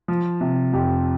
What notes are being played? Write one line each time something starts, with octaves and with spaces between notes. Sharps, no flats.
F3
C3
F2 G4